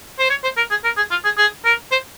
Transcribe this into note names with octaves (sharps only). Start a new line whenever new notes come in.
C5
C#5
C5
A#4
G#4
A#4
G#4
F4
G#4
G#4
A#4
C5